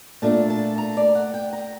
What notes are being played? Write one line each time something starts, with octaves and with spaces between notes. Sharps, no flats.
A#2 A3 D4 A5
A5
A#5
D5
F#5
G5
A#5